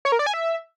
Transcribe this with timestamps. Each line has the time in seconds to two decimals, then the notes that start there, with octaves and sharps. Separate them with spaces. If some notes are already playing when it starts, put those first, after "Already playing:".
0.05 C#5
0.12 A#4
0.19 D5
0.26 G#5
0.34 E5